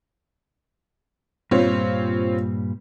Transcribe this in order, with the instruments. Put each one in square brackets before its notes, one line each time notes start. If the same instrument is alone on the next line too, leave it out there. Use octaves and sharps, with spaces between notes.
[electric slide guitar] G2 A#2 G3 [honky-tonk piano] C4 F4 C#5